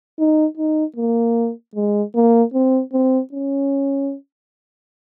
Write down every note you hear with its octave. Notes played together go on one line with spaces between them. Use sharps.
D#4
D#4
A#3
G#3
A#3
C4
C4
C#4